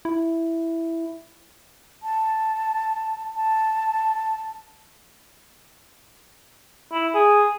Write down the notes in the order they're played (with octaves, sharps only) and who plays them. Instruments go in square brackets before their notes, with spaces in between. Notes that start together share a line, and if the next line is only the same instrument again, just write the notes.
[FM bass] E4
[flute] A5
A5
[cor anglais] E4
G#4